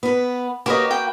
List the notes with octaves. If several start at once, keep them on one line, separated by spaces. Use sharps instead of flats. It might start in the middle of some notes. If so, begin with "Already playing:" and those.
B3 B4
A#3 F#4 G4 B4 C#5 D#5
G5